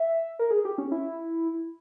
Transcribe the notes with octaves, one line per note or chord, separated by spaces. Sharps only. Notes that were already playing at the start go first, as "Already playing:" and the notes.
Already playing: E5
A#4
G#4
G4
C#4
E4